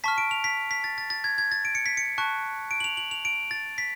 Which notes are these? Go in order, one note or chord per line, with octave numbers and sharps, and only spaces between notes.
A5 C#6 F6 B6
D7
F7
B6
B6
A6
A6
A6
G#6
G#6
A6
D7
C#7
B6
C#7
A5 C#6 F#6
D7
F#7
F7
F#7
F7
D7
A6
B6